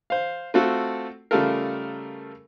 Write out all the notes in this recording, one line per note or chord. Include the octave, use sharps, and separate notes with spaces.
C5 F5
A3 C4 F4 F#4 A4
C#3 G3 A3 F4 A4 A#4